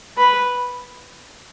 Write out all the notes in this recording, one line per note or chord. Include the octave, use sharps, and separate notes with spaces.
B4